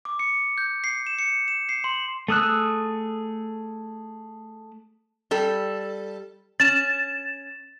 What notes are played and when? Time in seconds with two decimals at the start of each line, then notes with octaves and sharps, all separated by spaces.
0.05 D6
0.19 C#7
0.58 G6
0.84 C7
1.07 E7
1.19 C#7
1.48 E7
1.69 C7
1.84 C6
2.28 A3 G#4 D#6 E6 F#6
5.31 G3 A4
6.60 C#4 A6 E7